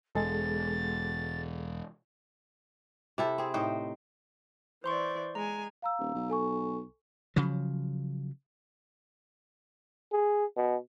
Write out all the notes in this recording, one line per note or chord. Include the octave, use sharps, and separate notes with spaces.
E1 G#3 G#4 A4 A6
C3 E4 A4
C4 G#4
A2 D#4 C5 G5
E3 C5 D5 C6 C#6
G#3 G#5 A#5
F5 A#5 E6
D#1
B1
A4 G#5 C#6
C#3 F3 F#3
G#4
B2